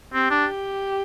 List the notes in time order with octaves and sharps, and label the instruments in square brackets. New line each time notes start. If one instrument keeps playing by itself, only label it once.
[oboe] C4 [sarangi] G4
[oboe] D4